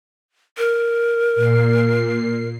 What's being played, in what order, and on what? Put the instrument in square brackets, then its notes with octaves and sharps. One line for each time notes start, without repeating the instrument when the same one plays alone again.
[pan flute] A#4
[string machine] A#2 C7